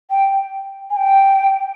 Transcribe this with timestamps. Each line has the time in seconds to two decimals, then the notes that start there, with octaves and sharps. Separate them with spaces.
0.10 G5
0.90 G#5
0.96 G5